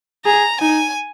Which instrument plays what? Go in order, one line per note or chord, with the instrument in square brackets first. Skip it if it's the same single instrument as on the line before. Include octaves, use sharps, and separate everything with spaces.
[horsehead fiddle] G#4 [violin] A#5
[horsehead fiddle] D#4 [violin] G#5